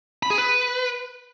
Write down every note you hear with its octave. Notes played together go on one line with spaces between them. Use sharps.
B5
G#4
B4